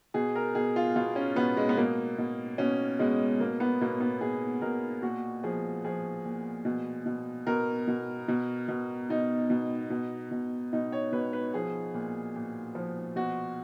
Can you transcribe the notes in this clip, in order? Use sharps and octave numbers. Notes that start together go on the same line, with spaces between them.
B2 G#4
A#4
B2 G#4
F4
B2 F4
C#4
B2 B3
G#3
B3
B2 A#3
B2
B2 C#4
B2 G#3
B2 A#3
B3
B2 A#3
B3
B2 G#4
B2 A#4
A#2 F#4
F3 G#4
F3 G#4
A#2
B2
B2
B2 A#4
B2
B2
B2
B2 D#4
B2
B2
B2
B2 D#4
C#5
B2 B4
B4
F3 G#4
A#2
A#2
F3
B2 F#4